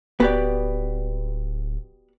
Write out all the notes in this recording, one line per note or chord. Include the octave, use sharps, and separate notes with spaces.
D1 B3 F#4 G4 D5